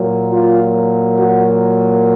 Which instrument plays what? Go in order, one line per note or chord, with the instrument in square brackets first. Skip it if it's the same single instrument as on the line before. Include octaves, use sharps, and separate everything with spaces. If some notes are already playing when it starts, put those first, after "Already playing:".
Already playing: [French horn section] A#2 F#3 A#3
F4
F#4